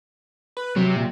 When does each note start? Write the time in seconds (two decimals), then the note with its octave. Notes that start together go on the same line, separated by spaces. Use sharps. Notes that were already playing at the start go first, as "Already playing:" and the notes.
0.57 B4
0.76 C3 F#3
0.96 A#2